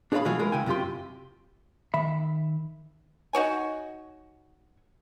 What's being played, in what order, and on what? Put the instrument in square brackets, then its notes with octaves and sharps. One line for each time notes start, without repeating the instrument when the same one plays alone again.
[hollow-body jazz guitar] D4 G#4 C#5 D5 F5 B5
B2 E3 F#3 F4 G#4
G#3 E4 A#4 B4
C#2 C#3 E4 G5 G#5
F#2 C3 F4 G4 C6
D#3 E5 B5
[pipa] D#4 F#4 C#5 G#5